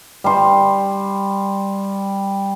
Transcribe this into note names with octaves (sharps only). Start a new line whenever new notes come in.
G3 G5 C6